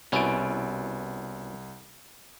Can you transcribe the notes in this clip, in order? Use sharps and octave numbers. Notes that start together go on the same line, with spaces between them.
C2 B2 C#4 E4 D7